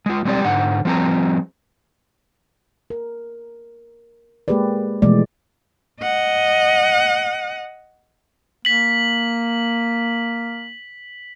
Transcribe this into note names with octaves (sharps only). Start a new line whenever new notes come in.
G#3 F4
G3 G#3 C4 G4 D5
G#2 D3 F#5
F3 G3 C4 G#4 A#5
A#4
G#3 A#3 G4 G#4 B4 D5
B2 E3 F3 G#3 A3 D5
D#5 F#5
A#3 B6 F#7